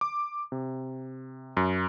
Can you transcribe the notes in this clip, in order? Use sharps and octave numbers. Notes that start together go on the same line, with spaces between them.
D6
C3
F#2